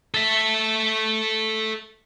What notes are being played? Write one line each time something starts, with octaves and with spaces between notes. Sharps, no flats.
A4 E5